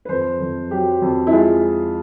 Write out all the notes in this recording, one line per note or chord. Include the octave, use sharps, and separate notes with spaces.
B4
F2 C5
F2
F#3 G4
F2
E4
G#3 F4